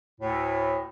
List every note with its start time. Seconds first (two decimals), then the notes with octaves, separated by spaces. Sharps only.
0.20 D2 A2